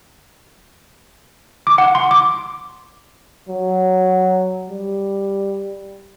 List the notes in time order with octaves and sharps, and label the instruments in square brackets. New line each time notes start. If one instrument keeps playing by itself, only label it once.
[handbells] D6
F#5
C6
D6
[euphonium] F#3
G3